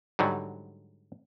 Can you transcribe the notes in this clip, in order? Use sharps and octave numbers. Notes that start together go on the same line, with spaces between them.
G#2 D3 F#3 G3